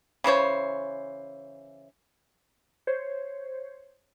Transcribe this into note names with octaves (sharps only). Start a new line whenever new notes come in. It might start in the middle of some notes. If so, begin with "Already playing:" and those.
C#3 E3 C5 C#5
C5 C#5